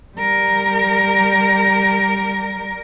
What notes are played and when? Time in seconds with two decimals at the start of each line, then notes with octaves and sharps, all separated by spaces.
0.17 G3 A#4